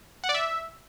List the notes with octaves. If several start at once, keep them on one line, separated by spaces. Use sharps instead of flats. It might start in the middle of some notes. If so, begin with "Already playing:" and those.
F#5
D5
E5